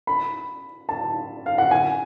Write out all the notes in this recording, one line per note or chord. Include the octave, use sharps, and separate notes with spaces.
B5
A5
F5
F#5
G#5